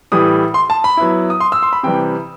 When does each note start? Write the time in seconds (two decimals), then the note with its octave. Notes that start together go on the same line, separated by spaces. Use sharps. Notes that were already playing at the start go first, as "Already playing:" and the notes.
0.12 A2 E3 G3 D#6
0.54 C6
0.70 A5
0.84 B5
0.97 F#3 B3 E4
1.30 D#6
1.40 C6
1.52 E6
1.63 C6
1.73 B5
1.83 C3 E3 G3 G5